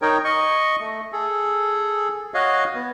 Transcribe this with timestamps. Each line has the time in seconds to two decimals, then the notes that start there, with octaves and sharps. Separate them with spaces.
0.02 D#4 A#4 C#5 G5
0.24 D#5 C#6
0.80 A3
1.12 G#4 A4
2.34 F#4 C#5 D#5 F5
2.75 B3